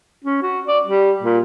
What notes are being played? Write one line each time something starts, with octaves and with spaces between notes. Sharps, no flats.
C#4
F#4
D5
G3
A#2